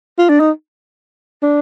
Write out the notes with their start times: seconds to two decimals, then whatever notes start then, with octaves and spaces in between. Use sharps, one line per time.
0.18 F4
0.29 D4
0.40 D#4
1.42 D4